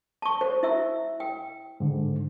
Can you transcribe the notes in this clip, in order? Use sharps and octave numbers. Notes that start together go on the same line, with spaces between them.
A5 C#6
C5
E4 E5 E6
G5
G#2 D3